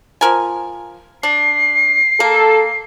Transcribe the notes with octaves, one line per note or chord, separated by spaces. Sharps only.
F3 A#4 G#5
D4 C7
A#3 A4